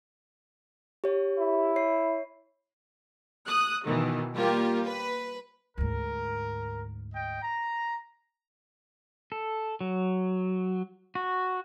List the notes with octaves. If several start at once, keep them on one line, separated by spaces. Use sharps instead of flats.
G4 C#5
E4
C#5 C7
D#6 F#6
B2 D#3 E3
G3 A#3 F4 G4 A#4
B4
D2 G#2 A#4
D#5 G5
A#5
A4
F#3
F#4